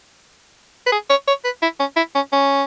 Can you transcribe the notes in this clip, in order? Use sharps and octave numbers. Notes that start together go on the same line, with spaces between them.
B4
G#4
C#5
C#5
B4
E4
C#4
E4
C#4
C#4